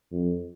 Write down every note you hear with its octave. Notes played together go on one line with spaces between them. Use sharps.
F2